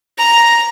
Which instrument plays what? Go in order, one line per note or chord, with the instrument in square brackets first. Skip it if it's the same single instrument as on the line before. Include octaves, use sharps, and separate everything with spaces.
[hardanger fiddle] A#5